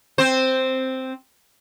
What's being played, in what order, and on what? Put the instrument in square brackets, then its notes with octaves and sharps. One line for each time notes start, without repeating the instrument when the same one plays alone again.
[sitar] C4 C5